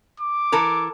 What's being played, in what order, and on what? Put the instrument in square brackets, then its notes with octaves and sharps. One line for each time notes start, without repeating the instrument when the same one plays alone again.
[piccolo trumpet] D6
[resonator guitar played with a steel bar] E3 A4 A#4